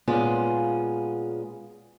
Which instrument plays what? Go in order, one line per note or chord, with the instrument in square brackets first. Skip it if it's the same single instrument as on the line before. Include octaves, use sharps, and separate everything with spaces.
[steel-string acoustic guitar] A#2 G#3 B3 C#4 F4 G#4